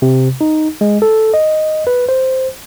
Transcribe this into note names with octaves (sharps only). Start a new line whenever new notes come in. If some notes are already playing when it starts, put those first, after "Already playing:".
C3
D#4
G#3
A4
D#5
B4
C5